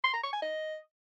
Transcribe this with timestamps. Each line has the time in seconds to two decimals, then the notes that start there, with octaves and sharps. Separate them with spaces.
0.04 C6
0.13 A#5
0.23 C#6
0.33 G#5
0.42 D#5